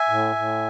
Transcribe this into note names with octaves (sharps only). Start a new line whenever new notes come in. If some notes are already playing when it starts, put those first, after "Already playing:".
Already playing: E5 G#5
A2
A2